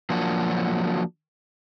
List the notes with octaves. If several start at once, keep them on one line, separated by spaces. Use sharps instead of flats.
F3 F#3 A#3 D4 F#4